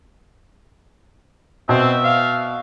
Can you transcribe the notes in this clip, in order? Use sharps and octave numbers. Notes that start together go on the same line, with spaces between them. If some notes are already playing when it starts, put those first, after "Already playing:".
B2 C4 E5
F5